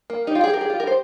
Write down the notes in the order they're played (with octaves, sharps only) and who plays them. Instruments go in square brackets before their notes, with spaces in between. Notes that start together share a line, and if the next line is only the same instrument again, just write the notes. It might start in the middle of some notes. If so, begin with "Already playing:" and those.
[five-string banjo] A#3
[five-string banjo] D#4 [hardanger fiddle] G4
[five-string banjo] F4
G#4
A#4
G#4
F4
A#4
C5